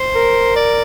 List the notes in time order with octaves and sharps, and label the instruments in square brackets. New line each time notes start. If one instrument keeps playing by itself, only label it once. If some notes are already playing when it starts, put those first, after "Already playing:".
Already playing: [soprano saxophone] C5
[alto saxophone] A#4
[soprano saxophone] D5